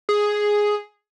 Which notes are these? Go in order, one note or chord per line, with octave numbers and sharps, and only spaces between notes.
G#4